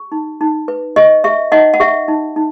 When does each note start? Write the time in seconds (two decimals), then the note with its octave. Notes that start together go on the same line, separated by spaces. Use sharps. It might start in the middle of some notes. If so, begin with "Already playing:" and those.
Already playing: G4
0.12 D#4
0.41 D#4
0.68 B4
0.96 G4 D#5
1.24 G4 E5
1.52 D#4 D#5 F#5
1.74 F#5
1.80 G4 E5
2.08 D#4
2.36 D#4